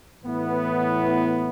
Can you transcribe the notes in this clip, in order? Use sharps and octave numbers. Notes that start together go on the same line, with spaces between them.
A2 E3 B3 E4